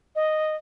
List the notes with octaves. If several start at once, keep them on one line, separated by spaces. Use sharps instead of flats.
D#5